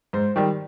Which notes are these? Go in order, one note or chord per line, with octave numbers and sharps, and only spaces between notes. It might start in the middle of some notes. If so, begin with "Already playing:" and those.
G#2 C5
D#3 G3